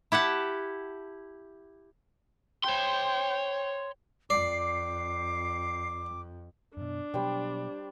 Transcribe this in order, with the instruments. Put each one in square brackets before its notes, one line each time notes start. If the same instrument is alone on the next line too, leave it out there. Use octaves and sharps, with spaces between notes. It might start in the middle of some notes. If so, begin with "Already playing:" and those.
[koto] E4 G4 F#5 A5
[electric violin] C5 G5 [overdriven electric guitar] C#5 C6
[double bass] F2 [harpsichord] D5 [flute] D6 [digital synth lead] C7
[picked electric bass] F#2 B2 [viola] D4
[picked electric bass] B2 F#3 [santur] G3 C5 G5